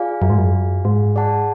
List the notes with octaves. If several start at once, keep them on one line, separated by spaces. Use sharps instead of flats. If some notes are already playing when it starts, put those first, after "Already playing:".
Already playing: F4 G#4 D5 F5 G#5
F#2
G#2
F#2
G#2
G#4 D5 F#5 A5